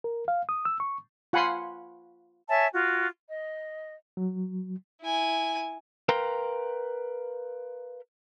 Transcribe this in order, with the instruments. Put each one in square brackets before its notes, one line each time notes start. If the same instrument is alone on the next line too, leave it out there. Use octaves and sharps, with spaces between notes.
[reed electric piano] A#4
F5
D#6
E6
C#6
[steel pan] F4 F#5 G#5 B5 C6
[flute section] C#5 E5 G#5 A5
F4 F#4
D#5
[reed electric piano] F#3
[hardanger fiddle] E4 G#5
[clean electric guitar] A#4 B4 F5 G5 A#5 C6